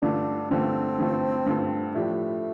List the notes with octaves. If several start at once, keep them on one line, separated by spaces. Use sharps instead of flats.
G2 D3 A3 D4 F4 A4
G2 D3 A3 C4 F4 A4
G2 D3 A3 F4 A4
G2 D3 A3 F4 A4
A2 F3 A3 D4 G4